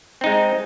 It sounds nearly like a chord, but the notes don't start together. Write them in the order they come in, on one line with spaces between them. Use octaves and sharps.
C4 D#4 G#3